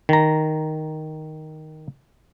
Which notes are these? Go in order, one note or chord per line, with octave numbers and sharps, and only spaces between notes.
D#3 A#5